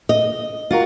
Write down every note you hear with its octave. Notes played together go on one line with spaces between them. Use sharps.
D#5
F4 F#4 A#4